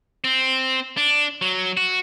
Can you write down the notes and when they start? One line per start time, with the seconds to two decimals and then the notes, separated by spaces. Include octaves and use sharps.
0.24 C4
0.97 D4
1.42 F#3
1.77 F#4